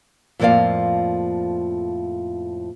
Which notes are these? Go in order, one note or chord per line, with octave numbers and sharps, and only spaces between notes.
F2 A2 F3 A#3 D5 F5